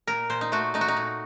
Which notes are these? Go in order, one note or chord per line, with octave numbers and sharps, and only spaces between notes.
A#2 A#4
A#2 C5
D#4
A3 F#4
A3 D#4
F#4
D#4
A#2